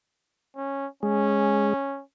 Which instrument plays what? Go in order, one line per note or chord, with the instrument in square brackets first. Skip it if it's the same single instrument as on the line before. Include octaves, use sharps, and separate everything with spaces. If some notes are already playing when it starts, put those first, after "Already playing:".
[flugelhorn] C#4
[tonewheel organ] G#3 [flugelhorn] C#4